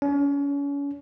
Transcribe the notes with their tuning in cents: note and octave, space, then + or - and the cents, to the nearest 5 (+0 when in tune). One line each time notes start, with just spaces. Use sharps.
C#4 +35